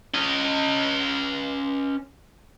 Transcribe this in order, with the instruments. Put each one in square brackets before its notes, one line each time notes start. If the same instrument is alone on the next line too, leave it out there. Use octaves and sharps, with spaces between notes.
[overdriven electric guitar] C#4 D#5